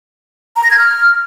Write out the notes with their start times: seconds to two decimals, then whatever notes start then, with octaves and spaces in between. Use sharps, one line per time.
0.56 A#5
0.63 A#6
0.71 G#6
0.78 F6